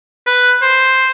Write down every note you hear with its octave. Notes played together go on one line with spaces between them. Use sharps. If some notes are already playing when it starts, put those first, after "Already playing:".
B4
C5